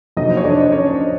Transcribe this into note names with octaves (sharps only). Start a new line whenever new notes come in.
F2 C3 D#3 F#3 A#3 D#4 D#5
C5
C#5
D4 D5
C5
C#4 C#5